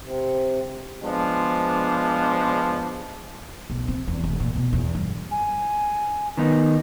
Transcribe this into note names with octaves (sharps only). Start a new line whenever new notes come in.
C3
F3 G#3 B3 D4
B1
C4
E2
F1
A#2
B2
E2
G2
G#5
D#3 B3 D#4